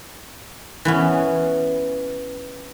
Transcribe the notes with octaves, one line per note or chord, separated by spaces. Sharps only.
E3 B3 C#4